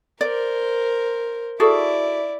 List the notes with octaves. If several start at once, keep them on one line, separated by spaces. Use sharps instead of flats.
A#4 C5 D5
E4 F#4 G#4 A4 D5